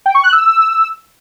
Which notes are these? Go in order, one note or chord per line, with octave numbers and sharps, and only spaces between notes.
G5
C#6
F#6
E6